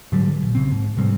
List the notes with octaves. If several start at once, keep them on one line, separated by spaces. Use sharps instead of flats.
G#2 D3 F#3 G3
A#1
C#3 C4
G#2
G#2 C3 G3 C4